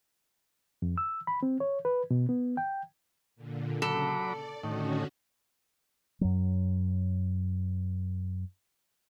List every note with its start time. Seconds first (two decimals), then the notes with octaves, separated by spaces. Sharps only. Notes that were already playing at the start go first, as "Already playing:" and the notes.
0.82 F2
0.98 E6
1.27 B5
1.43 C4
1.60 C#5
1.85 B4
2.11 B2
2.29 B3
2.57 G5
3.36 A#2 D3
3.82 C#3 F#3 A4 B5 D6
4.19 D5
4.63 A2 D3 D#3 C#4 F#4
6.21 F#2 F#3